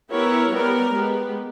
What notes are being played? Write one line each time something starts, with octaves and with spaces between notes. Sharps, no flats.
B3 E4 G4 A#4 C#5
G3 B3 G4 A#4
G#3 B3 G4